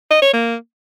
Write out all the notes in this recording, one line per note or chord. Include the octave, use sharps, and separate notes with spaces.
D#5
C#5
A#3